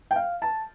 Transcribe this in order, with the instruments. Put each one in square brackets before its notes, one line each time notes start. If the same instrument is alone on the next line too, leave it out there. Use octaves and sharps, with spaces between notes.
[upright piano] G5
F5
A5